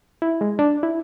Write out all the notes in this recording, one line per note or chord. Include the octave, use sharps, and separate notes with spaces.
E4
G#3
D4
E4